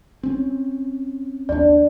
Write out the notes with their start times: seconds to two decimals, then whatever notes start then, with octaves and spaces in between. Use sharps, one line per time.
0.23 C4 C#4
1.49 D#2 B3 D4 D5